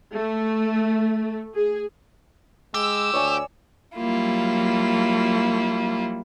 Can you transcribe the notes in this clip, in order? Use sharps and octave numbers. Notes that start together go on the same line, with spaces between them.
A3
G#4
G#3 G4 E6
D2 C#5 D5 G#5
F#3 G3 A#3 E4 F4